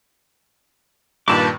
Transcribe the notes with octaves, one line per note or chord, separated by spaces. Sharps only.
G2 A#2 D#3 B4 A5 D6